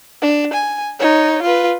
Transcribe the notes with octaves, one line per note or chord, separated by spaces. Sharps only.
D4
G#5
D#4 C#5
F4 B4